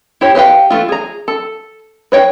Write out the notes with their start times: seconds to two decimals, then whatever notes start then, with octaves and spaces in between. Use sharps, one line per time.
0.21 E4 G4 C#5
0.35 G4 B4 F5 G5
0.70 E3 A3 F4
0.89 G#4 A#5
1.28 A4
2.12 B4 C#5 G5